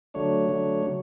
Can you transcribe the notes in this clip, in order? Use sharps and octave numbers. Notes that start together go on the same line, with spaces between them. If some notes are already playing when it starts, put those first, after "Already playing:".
D3 F#3 A3 D4 C#5
D3 F#3 A3 D4
C#3 F#3